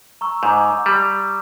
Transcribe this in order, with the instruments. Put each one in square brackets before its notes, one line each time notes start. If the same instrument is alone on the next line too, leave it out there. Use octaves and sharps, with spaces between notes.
[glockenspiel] A#5 C#6 E6
[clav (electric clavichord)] G#2 [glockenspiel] D6 D#6 G6
[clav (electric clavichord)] G3